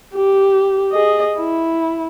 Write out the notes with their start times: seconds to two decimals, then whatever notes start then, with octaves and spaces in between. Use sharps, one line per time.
0.15 G4
0.92 G#4 D#5
1.37 E4